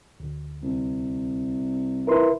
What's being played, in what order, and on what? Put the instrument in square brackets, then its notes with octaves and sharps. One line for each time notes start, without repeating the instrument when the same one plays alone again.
[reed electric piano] D2
[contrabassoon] C2
[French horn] E4 [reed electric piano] A#4 B4 C6